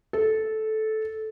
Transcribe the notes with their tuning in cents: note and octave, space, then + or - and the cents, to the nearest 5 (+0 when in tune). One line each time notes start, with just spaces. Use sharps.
A4 -15